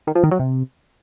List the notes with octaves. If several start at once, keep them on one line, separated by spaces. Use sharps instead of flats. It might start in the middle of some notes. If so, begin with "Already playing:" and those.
D#3
F3
D#3
F#3
C3